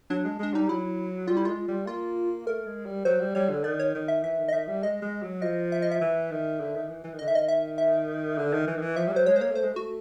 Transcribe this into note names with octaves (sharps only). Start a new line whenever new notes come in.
F#3 D4
G#3
G#3 D4
G3 D#4
F#3 E4
G3 F4
E4
G#3 F4
G3
A#3 F4
A3 A#4
G#3
G3
F#3 C5
G3
G3 C#5
D3
D#3 D5
C#5
D#3
E5
E3 E5
D#3
D#5
D#3 E5
G3
G#3 D#5
G#3
F#3
F3 D#5
E5
D#5
E5
E3
D#3
D3
D#3
E3
E3
D#3
D3 D#5
D#3 E5
D#5
E5
E5
D3
D#3
E3
D#3
E3
F3 E5
G3
F#3 C5
G#3 C#5
C5
A#3 C#5
A3 C5
G#3
A3 F#4